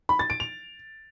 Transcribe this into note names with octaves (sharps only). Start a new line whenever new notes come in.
B5
A6
D7
F7